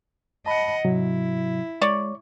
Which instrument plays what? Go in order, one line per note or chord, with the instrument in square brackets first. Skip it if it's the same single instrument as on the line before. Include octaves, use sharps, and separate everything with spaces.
[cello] D#5 F#5 [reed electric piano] A5 B5
[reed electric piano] G#2 C3 F#3 [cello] E4
[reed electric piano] G#3 [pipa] C#5 D5